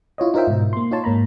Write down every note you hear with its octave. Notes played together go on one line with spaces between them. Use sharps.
E4 F4 C#5 D#5
D#4 F4 A#4 C5 E5 G5
G#2 B2
A#3 C6
D#4 F4 C#5 A5 C6
G#2 A#3 A#5 B5